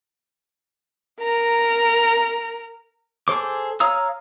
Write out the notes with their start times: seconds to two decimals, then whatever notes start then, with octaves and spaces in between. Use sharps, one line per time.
1.21 A#4 A#5
3.28 G#4 A4 C5 D6
3.80 C#5 F5 A#5 D#6 E6